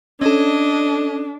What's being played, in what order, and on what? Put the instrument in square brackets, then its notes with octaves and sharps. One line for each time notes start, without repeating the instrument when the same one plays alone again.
[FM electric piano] C#4 A4 [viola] D4 [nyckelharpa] D#5